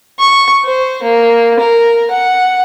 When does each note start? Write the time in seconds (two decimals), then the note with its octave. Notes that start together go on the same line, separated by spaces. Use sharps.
0.19 C#6
0.65 C5
1.03 A#3
1.60 A#4
2.11 F#5